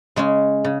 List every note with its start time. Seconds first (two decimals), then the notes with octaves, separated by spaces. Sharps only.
0.16 C#3 G#3 C#4
0.64 C#3